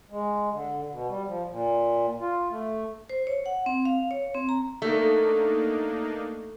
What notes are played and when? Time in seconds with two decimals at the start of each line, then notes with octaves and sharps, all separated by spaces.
0.10 G#3
0.51 D3
0.90 B2
1.08 G3
1.26 F3
1.49 A#2
2.20 F4
2.51 A3
3.09 C5
3.27 C#5
3.46 F#5
3.66 C4
3.85 F5
4.11 C#5
4.34 C4
4.49 A#5
4.82 A3 A#3 D4 D#4